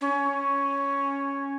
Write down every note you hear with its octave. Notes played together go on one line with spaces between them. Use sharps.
C#4